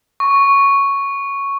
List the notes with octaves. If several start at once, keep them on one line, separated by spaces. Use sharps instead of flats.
C#6